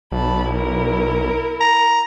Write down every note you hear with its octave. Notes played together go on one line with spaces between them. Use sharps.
B1 A5 B5
E4 A#4
A#5